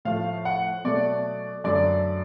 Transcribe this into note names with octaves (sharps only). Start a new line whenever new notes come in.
A2 F3 A3 F5
F#5
B2 F#3 A3 D5
F#2 D3 F#3 A3 D5